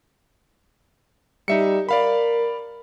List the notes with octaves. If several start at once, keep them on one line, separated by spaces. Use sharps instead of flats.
G3 D#4 E5 C#7
A#4 D5 F5 B5